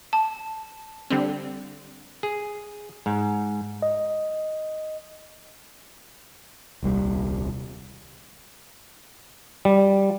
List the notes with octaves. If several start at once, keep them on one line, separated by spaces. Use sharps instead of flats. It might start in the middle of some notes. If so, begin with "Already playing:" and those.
A5
D3 G3 C4
G#4
G#2
D#5
D#1 C2 G3
G3